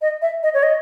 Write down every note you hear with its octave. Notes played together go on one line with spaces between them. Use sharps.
D#5
E5
D#5
C#5
D#5